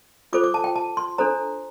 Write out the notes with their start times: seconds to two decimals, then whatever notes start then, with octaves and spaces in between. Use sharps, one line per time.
0.33 F4 A4 C5 D6
0.44 D6
0.54 A5
0.64 G5
0.76 A5
0.97 C6
1.18 D4 A4 C5 A#5